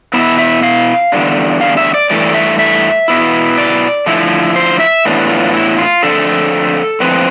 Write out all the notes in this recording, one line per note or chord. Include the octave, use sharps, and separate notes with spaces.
B2 B3 E4 E5
E5
F5
E2 D3 G3 D4
F5
E5
D5
G2 E3 A3 D5
E5
E5
B2 B3 E4
D5
D3 F3 A3 E4
C5
E5
A2 E3 B3 D4
F4
E4
F4
F2 D3 A3 D4 A4
A2 F3 C4 B4